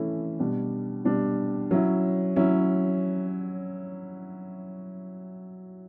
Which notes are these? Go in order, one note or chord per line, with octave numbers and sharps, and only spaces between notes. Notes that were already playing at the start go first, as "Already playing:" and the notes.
Already playing: E3 A3 C#4 E4
B2 G3 D4
B2 G3 D4
F#3 C#4 E4
F#3 C#4 E4